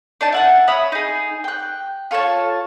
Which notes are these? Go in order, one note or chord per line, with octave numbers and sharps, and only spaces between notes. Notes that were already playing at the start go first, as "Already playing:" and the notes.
D4 D#4 A5
E4 F#5 A5
C#5 E5 B5 D#6
D#4 G#4
G5 F#6
F4 A4 C#5 A5